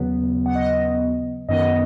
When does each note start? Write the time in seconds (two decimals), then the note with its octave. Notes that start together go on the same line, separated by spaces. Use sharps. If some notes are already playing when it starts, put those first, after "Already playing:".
Already playing: D#2 C#3 F#3 B3
0.46 F#5
0.55 D#5
1.48 F#2 D#3 B3 D#5